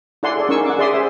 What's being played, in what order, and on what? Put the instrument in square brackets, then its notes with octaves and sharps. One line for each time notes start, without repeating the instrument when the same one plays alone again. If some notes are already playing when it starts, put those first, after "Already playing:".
[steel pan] E4 A4 D5 F#5 G#5 C6
G#4 A4 D5
C#4 D#4 A#4 G#5 C#6 E6
F#5 D6
G#4 D5 E5 C6 D#6
G#4 C5 E5 G#5